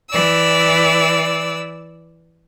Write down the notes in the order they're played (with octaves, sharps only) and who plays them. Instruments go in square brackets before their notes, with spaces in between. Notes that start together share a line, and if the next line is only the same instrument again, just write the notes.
[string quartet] E3 D5 E6